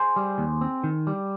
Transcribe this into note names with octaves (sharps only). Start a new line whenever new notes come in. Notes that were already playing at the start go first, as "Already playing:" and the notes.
Already playing: G#4 C5
G3
D#2
C4
D#3
G3